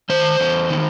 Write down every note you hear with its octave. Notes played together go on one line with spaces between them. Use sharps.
D#3 C5
E2
D#3